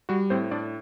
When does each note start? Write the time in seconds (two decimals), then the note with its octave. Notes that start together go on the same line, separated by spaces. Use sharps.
0.09 G3 F#4
0.30 A2 C4 C5
0.51 A2 D4 D5